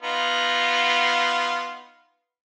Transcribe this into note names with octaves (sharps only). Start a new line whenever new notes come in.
B3 D#4 F4